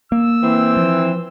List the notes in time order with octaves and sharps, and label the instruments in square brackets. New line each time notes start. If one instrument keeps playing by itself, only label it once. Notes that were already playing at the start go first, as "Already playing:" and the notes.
[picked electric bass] A#3 [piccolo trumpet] E6
[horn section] E3 C4
[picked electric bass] F3